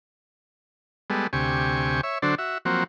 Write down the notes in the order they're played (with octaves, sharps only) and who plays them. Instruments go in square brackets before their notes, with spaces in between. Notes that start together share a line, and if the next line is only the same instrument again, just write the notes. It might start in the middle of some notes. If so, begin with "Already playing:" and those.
[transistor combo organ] G3 G#3 B3 A4
D2 C3 G4 G#5 C#6
C#5 E5
D3 F#3 D4 A4 C5
F#4 E5
F3 F#3 A#3 C4 F#4